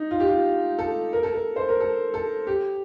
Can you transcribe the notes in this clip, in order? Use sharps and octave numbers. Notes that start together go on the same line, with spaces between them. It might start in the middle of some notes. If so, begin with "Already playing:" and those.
Already playing: D#4
F4
G4
F4
A4
A#4
A4
A#4
C5
A#4
A4
A4
G4